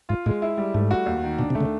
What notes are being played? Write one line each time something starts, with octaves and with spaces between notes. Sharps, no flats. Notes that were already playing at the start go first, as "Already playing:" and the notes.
G#2 F4
A2 G#3
E4
G3
G#2 A3
F#4
D#2
D#3
B2 D4
C3
A3
C#3